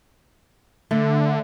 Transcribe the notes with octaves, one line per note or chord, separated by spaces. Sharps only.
D3 A3